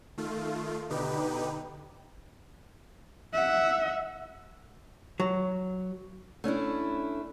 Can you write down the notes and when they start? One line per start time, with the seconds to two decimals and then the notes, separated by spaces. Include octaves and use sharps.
0.18 D#3 A3 F4
0.89 B2 D3 D#4 G4 B4
3.34 E5 F#5
5.20 F#3
6.44 A3 C#4 D4 E4